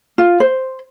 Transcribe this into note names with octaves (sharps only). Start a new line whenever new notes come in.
F4
C5